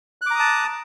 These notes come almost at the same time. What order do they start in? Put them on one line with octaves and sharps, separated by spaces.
F#6 D6 A#5 D#6 A5